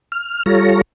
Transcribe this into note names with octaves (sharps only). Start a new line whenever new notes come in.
F6
G3 F4 A4 C#5 A#5